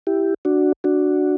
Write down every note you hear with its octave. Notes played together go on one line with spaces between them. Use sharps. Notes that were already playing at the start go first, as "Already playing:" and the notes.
E4 G4
D4 F#4
D4 F#4